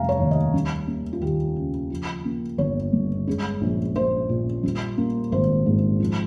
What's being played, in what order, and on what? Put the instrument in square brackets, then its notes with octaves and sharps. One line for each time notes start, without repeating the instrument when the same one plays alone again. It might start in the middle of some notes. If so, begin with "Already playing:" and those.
Already playing: [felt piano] F1 G3 F5 G#5 A#5
C#5
D#2
D#5
G3
A#3
F4
D#2 G4
C#3
F3
A#3
G1 C#5
G2
G#3
A#1
A#1 C5
A#2
G3
A#3
G#1 C5
G#2
F3